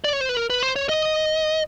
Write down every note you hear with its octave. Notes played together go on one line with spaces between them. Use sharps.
D5
C#5
C5
B4
A#4
B4
C5
C#5
D#5